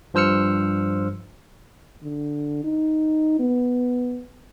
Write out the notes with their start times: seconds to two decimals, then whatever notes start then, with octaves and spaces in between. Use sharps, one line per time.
0.14 G2 F3 C5 E6 F6 C#7
2.03 D3
2.64 D#4
3.39 B3